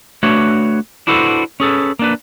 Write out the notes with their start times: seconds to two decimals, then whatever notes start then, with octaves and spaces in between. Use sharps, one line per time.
0.23 A3 D4 F#4 B4 C#5
1.07 D4 E4 F#4 A4 B4 C5
1.60 C#4 G#4 A4 B4
1.99 A#3 D4 B4